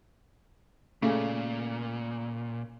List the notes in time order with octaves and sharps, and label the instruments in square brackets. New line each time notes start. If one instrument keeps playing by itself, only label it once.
[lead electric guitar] A#2 [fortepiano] C#3 [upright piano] A3